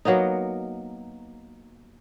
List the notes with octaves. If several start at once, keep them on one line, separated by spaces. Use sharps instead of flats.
F#3 A#3 B3 D#4